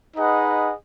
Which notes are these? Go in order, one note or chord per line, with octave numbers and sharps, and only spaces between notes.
D#4 G#4 B4 D#5 F#5